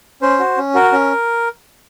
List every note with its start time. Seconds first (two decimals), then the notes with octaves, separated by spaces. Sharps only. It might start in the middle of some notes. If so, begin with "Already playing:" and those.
0.22 C#4 C5
0.39 F#4
0.57 C#4
0.75 F#4 A#4
0.93 C#4